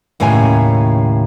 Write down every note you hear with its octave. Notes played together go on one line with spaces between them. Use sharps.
D#2 A2 C#3 C#5 G#5